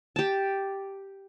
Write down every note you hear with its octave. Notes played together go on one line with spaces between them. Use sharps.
G4 A5